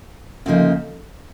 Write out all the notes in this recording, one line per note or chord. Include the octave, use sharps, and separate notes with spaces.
D2 C#3 F3 A#3 D#4